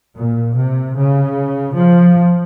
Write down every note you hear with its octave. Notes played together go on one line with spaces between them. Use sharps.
A#2
C3
C#3
F3